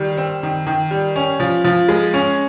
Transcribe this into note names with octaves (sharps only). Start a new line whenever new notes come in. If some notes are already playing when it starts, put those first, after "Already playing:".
Already playing: D#3 G3
C4
D#3
D#3
G3
C#4
F3
F3
G#3
C#4